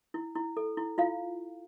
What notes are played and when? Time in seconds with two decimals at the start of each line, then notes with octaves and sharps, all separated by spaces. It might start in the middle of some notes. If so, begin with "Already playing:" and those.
0.14 E4
0.35 E4
0.57 A4
0.77 E4
0.98 E4 F4 F5